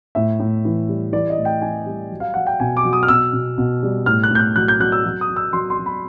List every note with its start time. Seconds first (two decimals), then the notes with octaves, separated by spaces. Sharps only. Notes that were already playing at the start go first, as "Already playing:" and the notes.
0.15 A2 E5
0.40 A2
0.65 E3
0.89 G3
1.13 E3 D5
1.30 D#5
1.37 A2
1.45 G5
1.62 E3 G#5
1.86 G3
2.11 F#3
2.20 F5
2.34 F#3 F#5
2.47 G5
2.60 B2 G#5
2.77 D6
2.84 F#3
2.93 D#6
3.03 F6
3.08 B2 E6
3.33 B2
3.58 B2
3.83 G3
4.06 A2 F6
4.24 F#6
4.31 A2 G6
4.39 F#6
4.56 F#3 F#6
4.68 G6
4.80 F#3 F#6
4.92 E6
5.05 F#3
5.21 D#6
5.29 F#3
5.36 E6
5.53 F#3 C6
5.70 C6
5.78 F#3
5.86 B5